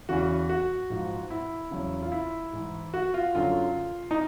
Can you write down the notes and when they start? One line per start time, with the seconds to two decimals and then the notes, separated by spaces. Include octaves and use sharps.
0.09 E2 C#3 E3 F#4
0.49 F#4
0.90 G#2 F3
1.30 E4
1.71 E2 C#3 F#3
2.02 F4
2.12 E4
2.53 G#2 E3
2.94 F#4
3.14 F4
3.35 F#2 D3 F#3 F4
4.11 D#4